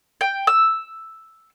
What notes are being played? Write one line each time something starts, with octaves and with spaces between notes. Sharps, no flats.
G5
E6